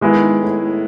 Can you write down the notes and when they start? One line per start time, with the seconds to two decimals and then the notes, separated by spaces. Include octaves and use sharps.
0.01 G#2 D#3 G#3 B3 E4
0.21 G#2
0.41 A2
0.61 A2